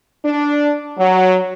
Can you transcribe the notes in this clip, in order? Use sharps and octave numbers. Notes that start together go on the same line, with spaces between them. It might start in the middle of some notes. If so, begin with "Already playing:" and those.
D4
F#3